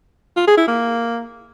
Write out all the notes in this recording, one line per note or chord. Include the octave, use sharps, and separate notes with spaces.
F4
G#4
E4
A#3